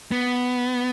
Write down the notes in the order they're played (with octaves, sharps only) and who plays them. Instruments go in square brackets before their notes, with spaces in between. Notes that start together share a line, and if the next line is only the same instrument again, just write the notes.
[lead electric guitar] B3